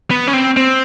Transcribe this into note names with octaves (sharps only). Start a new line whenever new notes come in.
B3
C#4
C4
C4